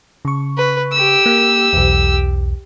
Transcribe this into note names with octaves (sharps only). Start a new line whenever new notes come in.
C#3 C#6
B4
G4 E6
A#3
B1 E2